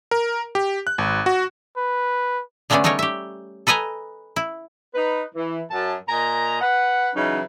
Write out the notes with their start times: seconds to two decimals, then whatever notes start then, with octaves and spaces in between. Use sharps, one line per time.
0.11 A#4
0.55 G4
0.87 F#6
0.98 G#1
1.26 F#4
1.77 B4
2.70 D3 G#3 A3 B3 C#4 D4
2.84 G3 A3 D#4 A#4 C#5
2.99 G4 E5
3.67 A4 B4 D#5 G#5 A#5
4.36 E4
4.95 D#4 B4
5.35 E3
5.71 F#2 A5
6.09 A#2 D#5 G#5 A#5
6.62 B4 F#5
7.15 C#3 E3 F#3 C#4 D#4